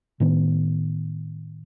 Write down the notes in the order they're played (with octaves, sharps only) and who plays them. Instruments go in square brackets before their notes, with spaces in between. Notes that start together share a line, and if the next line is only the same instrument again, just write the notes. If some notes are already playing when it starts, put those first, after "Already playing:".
[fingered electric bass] A2 D#3 B3